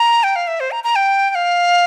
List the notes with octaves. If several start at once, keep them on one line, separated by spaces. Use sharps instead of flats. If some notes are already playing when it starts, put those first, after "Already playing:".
Already playing: A#5
G5
F5
E5
C5
A#5
A#5
G5
G5
F5